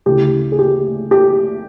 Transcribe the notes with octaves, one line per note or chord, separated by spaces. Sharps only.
D2 C#3 E3 G4
G#4
G4
G4